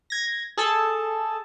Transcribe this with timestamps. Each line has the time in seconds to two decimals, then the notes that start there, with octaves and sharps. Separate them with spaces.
0.10 G#6 A#6
0.57 G#4 A4 A5